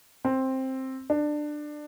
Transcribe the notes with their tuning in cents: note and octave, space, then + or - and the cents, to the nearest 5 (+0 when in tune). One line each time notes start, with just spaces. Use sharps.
C4 +10
D4 +20